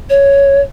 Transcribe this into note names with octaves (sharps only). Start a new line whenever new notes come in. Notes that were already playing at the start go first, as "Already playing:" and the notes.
C#5